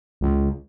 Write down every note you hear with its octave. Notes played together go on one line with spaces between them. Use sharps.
C#2